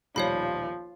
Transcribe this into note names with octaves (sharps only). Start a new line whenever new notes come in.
D#1 B1 F3 G3 C#5 F5 B5